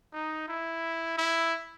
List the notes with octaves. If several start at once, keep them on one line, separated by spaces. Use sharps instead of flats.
D#4
E4
E4